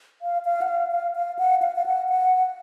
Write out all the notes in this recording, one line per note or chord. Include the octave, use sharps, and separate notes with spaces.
F5
F5
F#5
F5
F5
F5
F#5
F5
F5
F#5
F#5